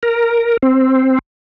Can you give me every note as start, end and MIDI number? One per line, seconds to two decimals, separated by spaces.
0.03 0.57 70
0.63 1.19 60